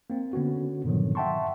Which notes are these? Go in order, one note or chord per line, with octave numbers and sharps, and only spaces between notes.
A#3 C4
D3 B3 C#4 F#4
G2 A#2 D3 D#3 F3 F#3
E5 F#5 G5 A5 C6 C#6